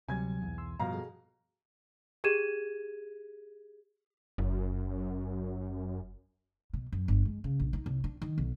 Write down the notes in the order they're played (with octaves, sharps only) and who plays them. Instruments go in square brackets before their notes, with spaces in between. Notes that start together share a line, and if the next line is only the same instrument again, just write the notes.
[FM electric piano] D2 F#3 [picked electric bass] C3 G3 [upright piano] G#5 G#6
[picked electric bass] B1 E2
[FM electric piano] C6 E6
[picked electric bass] G2 F3 [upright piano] B2 F5 A#5
[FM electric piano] G#4 A4
[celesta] G4 G#4 G#6 D#7 E7
[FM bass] F#1 [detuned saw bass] F#2
[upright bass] B2
F#2
G1
G#3
C#3
A#1
D#4
C2
D4
D#3
B1